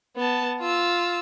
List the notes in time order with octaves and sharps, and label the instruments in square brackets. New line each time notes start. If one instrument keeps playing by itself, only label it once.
[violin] B3 A5
F4 E6